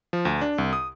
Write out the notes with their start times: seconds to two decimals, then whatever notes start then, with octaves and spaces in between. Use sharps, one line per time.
0.13 F3
0.25 D2
0.41 D4
0.58 C2
0.73 D#6